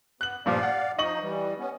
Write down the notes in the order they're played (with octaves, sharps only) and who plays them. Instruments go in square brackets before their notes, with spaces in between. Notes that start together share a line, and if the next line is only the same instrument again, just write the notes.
[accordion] B3 [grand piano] F#6 F#7
[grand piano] G2 A#2 F3 [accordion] D5 F5
[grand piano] F#5
[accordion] F3 D#4 [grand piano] D#5 C#6 F#7
[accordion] E3 G3
B3 C#4